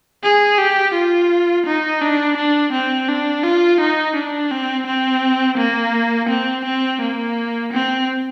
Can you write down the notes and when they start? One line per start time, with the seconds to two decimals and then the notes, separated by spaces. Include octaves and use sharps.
0.24 G#4
0.59 G4
0.94 F4
1.67 D#4
2.02 D4
2.37 D4
2.73 C4
3.09 D4
3.44 F4
3.80 D#4
4.16 D4
4.51 C4
4.87 C4
5.58 A#3
6.29 C4
6.65 C4
7.01 A#3
7.73 C4